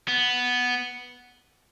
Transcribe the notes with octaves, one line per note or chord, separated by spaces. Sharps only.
B3